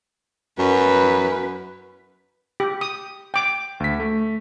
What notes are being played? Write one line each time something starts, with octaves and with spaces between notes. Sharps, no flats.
F#2 B4
G4
D#6
G5 D6
D2 B6
A3